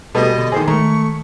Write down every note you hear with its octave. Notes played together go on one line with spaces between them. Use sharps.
B2 G3 B3 G#4 A4 D#5
D3
D#3 G#4 C5
D#3 G#3 A3 A#4 C#6